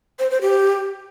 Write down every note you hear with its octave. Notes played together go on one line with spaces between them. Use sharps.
C5
C5
G4